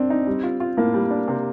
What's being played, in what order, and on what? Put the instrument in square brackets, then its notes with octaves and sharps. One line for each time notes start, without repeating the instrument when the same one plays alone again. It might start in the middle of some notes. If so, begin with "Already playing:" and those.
Already playing: [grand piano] C4 D4
[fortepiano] D#4
G3
F4
F4
[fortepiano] A2 [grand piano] A#3
[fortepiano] G3
D4
C3